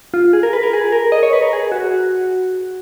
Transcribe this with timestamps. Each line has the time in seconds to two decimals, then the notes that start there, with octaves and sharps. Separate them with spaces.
0.14 F4
0.33 G#4
0.43 A#4
0.53 B4
0.63 A#4
0.73 G#4
0.92 A#4
1.12 D#5
1.23 C#5
1.33 B4
1.42 A#4
1.53 G#4
1.72 F#4